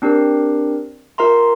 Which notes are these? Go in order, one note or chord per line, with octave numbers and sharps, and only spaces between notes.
C4 D4 G4 A#4
F4 A#4 E5 A#5 C6